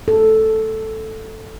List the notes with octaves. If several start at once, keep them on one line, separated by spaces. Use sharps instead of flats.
A4